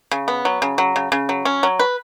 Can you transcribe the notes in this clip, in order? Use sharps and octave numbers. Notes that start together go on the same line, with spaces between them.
C#3
B3
F#3
C#3
F#3
C#3
C#3
F#3
C#4
F#3
B4